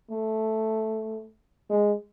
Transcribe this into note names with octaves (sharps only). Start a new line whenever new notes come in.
A3
G#3